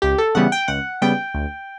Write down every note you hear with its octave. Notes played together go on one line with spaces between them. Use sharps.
C#2 G4
A4
C#3 E3 G3 B3 F#5
G5
C#2 F#5
C#3 G3 B3 G5
D2